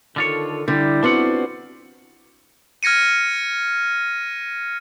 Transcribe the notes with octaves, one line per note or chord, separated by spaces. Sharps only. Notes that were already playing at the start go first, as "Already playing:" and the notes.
D3 D#3 F4 A4 C#5
D3 G3 E4
B3 C4 D4 F4 F#4 F#5
F6 G#6 A#6 C#7 D#7